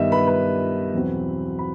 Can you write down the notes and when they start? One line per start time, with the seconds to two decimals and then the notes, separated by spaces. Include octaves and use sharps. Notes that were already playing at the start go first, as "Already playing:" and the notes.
Already playing: G2 D#3 G3 B3 D#5 E5
0.12 B4 B5
0.27 B4 B5
0.93 E2 B2 F#3 C4
1.59 B5